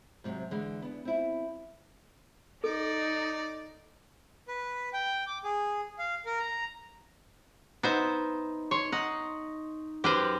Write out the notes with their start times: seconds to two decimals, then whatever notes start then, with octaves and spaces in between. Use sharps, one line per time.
0.24 G#2 C3 E3 F#3
0.51 D3 E3 G#3
0.82 B3 D4
1.05 C4 E4
2.64 D#4 A4 D5
4.48 B4
4.93 G5
5.27 D6
5.44 G#4
5.99 F5
6.26 A#4
6.39 A#5
7.83 B3 D#4 C5 E5
8.71 C#5 C6 C#6
8.92 D#4 F#5
10.04 F#2 G4 B4 C5